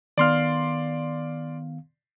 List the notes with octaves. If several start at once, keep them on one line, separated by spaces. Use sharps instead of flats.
D#3 B3 D5 F5 C6 F6